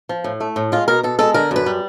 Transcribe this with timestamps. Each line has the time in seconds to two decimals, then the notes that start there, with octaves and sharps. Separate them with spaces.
0.09 F3
0.24 A2
0.40 A3
0.56 A2
0.72 G#3 F4
0.88 B2 A#4
1.03 B2 A4
1.19 G#3 A4
1.34 D3 A#4
1.51 F#2 B4
1.66 G3